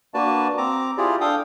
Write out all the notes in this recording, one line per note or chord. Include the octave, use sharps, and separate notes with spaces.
A#3 D4 F#4 B4 D5 A5
C4 A#5 D6
E4 F4 G4 G#4 D5
D4 A4 F5 G5 D#6